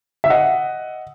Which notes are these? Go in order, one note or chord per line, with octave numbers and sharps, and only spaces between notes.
E5
D#5 F#5